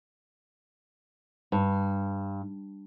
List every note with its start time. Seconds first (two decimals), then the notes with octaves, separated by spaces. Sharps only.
1.52 G2